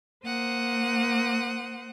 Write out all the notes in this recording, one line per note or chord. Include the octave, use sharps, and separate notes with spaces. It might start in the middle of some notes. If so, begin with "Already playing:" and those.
A#3 C5 F#5 D#6